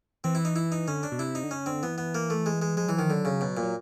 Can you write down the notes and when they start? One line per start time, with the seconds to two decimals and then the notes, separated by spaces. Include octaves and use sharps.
0.24 E3 C4
0.35 E4
0.45 D#4
0.56 E4
0.72 D#4
0.88 D3 C#4
1.03 D4
1.12 B2
1.19 C3 E4
1.35 D#4
1.44 D3
1.51 C#3 C#4
1.66 D3 C4
1.83 E3 B3
1.98 B3
2.15 A#3
2.30 A3
2.46 G#3
2.62 G#3
2.77 F3 G#3
2.87 E3 F#3
2.95 D#3 F3
3.10 D3 F#3
3.25 C#3
3.41 B2
3.57 A#2
3.62 F#3